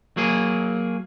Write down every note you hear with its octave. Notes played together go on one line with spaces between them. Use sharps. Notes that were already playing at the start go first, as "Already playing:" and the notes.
F#3 A#3 G#4